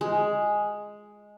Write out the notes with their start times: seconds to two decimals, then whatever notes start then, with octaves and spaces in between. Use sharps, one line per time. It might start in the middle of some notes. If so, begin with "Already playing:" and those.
0.01 G#3